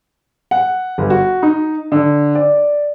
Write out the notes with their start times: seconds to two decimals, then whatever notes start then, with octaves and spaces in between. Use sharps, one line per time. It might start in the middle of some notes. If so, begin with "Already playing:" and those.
0.51 F#5
0.98 G1
1.10 F#4
1.43 D#4
1.92 D3
2.35 D5